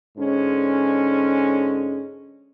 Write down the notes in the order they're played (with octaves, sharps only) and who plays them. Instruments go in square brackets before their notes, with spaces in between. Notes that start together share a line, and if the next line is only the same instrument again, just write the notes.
[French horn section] G#2 D3 G#3 C#4